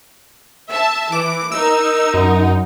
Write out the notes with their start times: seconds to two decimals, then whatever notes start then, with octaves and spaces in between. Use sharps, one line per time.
0.69 E5 A5
1.12 E3 D6
1.52 D#4 A#4 E6
2.14 F#2